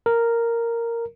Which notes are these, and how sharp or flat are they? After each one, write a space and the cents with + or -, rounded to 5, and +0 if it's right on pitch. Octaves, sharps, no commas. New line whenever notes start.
A#4 -5